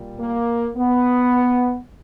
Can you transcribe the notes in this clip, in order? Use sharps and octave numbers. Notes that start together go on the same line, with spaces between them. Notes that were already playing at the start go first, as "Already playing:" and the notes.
Already playing: A#2 G3
A#3
B3